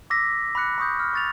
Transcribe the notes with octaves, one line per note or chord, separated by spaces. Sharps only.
D6 E6 A#6 B6
B5 D6 F#6 C#7
B5 C#6 D#6 G6
F6
C#6 A6 F7